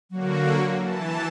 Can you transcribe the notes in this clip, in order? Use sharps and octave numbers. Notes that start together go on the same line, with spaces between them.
D3 F#3 A#3 F#4
E3 A5